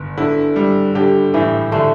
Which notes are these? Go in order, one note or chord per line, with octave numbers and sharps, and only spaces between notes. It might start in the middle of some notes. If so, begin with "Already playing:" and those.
Already playing: G1
D3 E4
G3
D3 G4
A2 E3
D3 A3